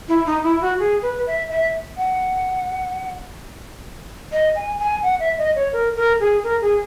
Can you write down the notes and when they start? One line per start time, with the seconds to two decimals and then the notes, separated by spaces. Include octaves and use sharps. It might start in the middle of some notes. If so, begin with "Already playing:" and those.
0.09 E4
0.26 D#4
0.44 E4
0.61 F#4
0.79 G#4
1.02 B4
1.27 E5
1.50 E5
1.97 F#5
4.32 D#5
4.55 G#5
4.79 G#5
5.03 F#5
5.20 E5
5.38 D#5
5.56 C#5
5.73 A#4
5.96 A#4
6.20 G#4
6.44 A#4
6.61 G#4